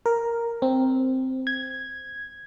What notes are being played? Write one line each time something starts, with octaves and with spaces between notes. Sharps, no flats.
A#4
C4
G#6